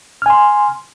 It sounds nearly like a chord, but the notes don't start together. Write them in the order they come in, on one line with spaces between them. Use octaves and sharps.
F6 G#5 C6